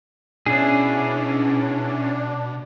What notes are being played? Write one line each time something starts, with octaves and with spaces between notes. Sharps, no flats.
B2 C#4 D4 E4 G#4